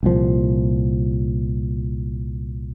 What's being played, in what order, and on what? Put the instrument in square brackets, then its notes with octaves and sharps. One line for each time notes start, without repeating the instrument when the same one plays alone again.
[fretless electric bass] C2 A#2 F3